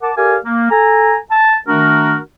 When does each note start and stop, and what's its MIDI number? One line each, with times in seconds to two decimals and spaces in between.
0.02 0.12 70
0.02 0.12 78
0.02 0.12 81
0.02 0.12 86
0.17 0.36 67
0.17 0.36 69
0.17 0.36 70
0.17 0.36 74
0.17 0.36 77
0.17 0.36 80
0.44 0.67 58
0.70 1.16 69
0.70 1.16 80
0.70 1.16 82
1.31 1.57 81
1.68 2.18 51
1.68 2.18 57
1.68 2.18 62
1.68 2.18 66
1.68 2.18 70